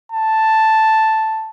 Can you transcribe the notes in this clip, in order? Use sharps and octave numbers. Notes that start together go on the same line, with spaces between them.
A5